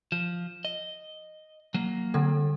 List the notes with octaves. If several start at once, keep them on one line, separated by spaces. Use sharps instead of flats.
F3
D#5
F#3 A#3
D3 G3 A4